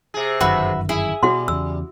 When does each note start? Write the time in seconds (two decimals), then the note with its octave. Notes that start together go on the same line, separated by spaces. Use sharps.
0.14 C3 G#4
0.41 G1 F#2 D#3 F#4 B4 E5
0.89 E4 G#4
1.23 B2 G3 F#4 F#5 C6
1.48 E2 C#3 E6